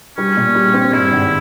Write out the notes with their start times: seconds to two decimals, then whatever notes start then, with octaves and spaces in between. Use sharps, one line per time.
0.18 G3 C#4
0.37 A#2
0.55 G3
0.74 C4
0.93 G2 E4
1.12 G#1